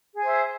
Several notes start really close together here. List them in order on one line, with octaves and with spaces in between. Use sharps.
G#4 G#5 C5 E5